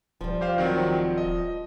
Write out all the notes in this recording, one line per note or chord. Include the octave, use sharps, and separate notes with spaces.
D#1 F3 G3
G4 C5 F5
D#3 F#3 C4
D#5